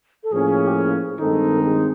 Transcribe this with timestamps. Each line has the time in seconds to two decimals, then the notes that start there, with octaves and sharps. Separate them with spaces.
0.24 A4
0.31 A2 F3 A#3 C#4 G#4
0.67 G4
0.75 G#4
1.19 G2 D#3 G#3 C4 D#4 A4
1.64 G#4